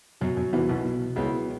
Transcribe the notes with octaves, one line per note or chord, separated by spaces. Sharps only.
F#2 B2 F#3
F#2 F#3
E2 E3 F#3 B3 E4
B1 B2
B2
C#2 C#3 F#3 B3 E4